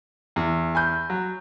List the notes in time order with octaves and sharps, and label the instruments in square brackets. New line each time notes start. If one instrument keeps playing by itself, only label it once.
[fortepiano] E2
[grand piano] G#5 B5 G6
[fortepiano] F#3